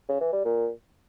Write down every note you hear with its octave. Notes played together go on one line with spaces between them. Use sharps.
C#3
E3
G3
A#2